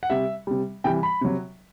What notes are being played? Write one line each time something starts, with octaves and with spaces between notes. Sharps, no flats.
F#5
C3 G3 E5
C3 G3
C3 E3 G3 G5
B5
C3 F#3